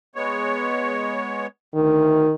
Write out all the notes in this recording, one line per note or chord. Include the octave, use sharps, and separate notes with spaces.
G#3 B3 C#5
D2 D#3